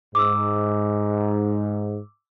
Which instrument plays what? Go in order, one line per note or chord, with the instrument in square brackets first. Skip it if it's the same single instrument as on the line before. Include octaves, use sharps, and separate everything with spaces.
[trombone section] G#2 [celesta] D6 E6